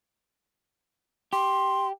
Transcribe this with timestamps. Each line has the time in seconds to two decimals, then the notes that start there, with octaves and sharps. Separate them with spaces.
1.33 G4 C6